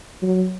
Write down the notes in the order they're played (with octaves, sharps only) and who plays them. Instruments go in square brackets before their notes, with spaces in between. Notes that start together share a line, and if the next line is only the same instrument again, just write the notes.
[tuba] F#3